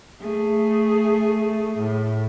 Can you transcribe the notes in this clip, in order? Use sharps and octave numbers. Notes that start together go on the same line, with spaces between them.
A3 G#4
A2